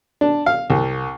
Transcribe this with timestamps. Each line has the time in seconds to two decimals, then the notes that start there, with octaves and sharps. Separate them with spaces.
0.21 D4
0.46 F5
0.70 C2